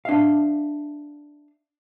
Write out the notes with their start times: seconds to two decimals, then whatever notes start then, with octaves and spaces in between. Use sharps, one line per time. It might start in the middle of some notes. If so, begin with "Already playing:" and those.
0.05 D4 E5 F5